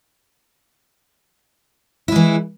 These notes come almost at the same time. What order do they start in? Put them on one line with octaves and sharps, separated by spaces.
E4 G#3 E3